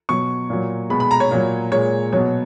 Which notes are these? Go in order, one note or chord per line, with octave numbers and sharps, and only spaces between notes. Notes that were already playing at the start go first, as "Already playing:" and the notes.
B2 F#3 C#6
A#2 F#3
B2 G#3 B5
B5
A#5
C#5
A#2 F#3
A#2 G#3 C#5
B2 F#3 C#5